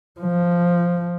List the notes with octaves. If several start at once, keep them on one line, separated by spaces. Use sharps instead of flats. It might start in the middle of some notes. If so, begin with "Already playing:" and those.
F3